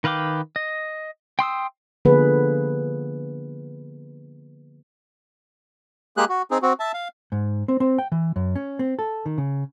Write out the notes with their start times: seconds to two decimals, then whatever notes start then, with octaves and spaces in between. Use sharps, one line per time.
0.04 D#3 B4 F5 G5 D6
0.56 D#5
1.39 G5 C6 D#6 E6
2.05 D3 F3 A#3 B3 G#4 B4
6.17 G#3 A#3 G4 G#4 F#6
6.29 F#4
6.51 C4 D#4 G#4
6.62 C4 F#4
6.80 E5 A5
6.94 F5
7.32 G#2
7.68 C4
7.80 C4
7.98 G5
8.12 E3
8.36 F#2
8.56 C#4
8.79 C4
8.99 A4
9.26 D#3
9.38 C#3